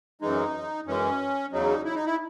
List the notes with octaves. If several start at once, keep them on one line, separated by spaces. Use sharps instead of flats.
F#2 E3 G#3 D#4
F#2 E3 G#3 C#4
E2 C#3 F#3 D#4
E4
D#4
E4